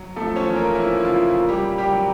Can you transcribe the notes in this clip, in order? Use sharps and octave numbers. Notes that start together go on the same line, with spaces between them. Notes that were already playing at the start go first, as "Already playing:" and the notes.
Already playing: F#3
F3 A3 A4
C#4 C#5
E2
A#3 A#4
F3 E4
E4
C#3 F4
A#3
G3 G4
A#2
G3 G4
F#3